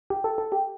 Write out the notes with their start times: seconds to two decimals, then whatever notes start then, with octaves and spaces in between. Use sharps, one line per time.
0.10 G4
0.24 A4
0.38 A4
0.52 G4